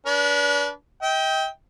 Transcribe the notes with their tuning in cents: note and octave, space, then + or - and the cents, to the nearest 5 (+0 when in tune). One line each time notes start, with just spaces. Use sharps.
D4 -35 B4 -30
D#5 +45 G5 +0